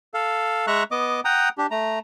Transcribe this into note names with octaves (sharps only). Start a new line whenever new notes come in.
A4 F5
G#3 E5 A#5 C#6 F#6
B3 D#5 D6
F#5 G5 A#5 D#6
D4 G4
A3 A#5